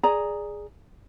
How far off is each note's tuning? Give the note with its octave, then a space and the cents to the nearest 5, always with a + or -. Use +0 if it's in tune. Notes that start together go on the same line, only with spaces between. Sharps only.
G#4 +0 D5 +0 A#5 +0